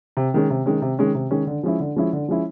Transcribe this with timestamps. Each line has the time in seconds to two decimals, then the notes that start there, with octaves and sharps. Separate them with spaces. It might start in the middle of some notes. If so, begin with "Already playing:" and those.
0.17 C3
0.34 D#3 G#3 C#4
0.50 C3
0.66 D#3 G#3 C#4
0.82 C3
0.99 D#3 G#3 C#4
1.15 C3
1.31 D#3 G#3 C#4
1.47 D3
1.63 F3 G#3 C#4 E4
1.80 D3
1.96 F3 G#3 C#4 E4
2.13 D3
2.28 F3 G#3 C#4 E4